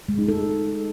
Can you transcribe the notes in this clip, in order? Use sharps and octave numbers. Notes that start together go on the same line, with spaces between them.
G#3
D#4
A4